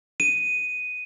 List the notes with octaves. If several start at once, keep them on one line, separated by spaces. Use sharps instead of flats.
D#7